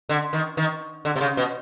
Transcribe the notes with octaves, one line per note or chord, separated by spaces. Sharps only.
D3
D#3
D#3
D3
C3
C#3
B2